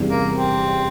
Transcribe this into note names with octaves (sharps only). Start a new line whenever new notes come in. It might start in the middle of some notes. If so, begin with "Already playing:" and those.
Already playing: E2 C3 G3 C#4
A#3
C4